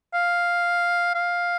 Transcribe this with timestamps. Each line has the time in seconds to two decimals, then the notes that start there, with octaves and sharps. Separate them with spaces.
0.14 F5
1.15 F5